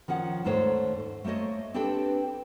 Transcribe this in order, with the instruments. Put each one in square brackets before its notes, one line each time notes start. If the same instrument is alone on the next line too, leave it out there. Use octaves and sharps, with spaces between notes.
[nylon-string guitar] D#3 F3 C#4 F#5
D#2 G#2 A3 C5 C#5
A3 A#3 C5 C#5 D#5
C4 D4 G4 A4 B4 G5